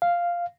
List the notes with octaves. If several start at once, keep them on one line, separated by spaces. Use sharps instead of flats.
F5